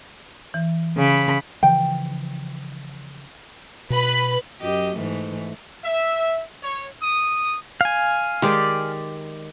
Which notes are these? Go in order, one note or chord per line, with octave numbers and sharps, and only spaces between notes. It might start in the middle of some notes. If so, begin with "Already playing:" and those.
E3
C#3 B5
C#3 E3 F3 G5
B2 B4 B5
F#2 G4 D#5
G#2 E3 A3
E5
C#5
D#6
F5 G#5
D#3 G#3 G4 D5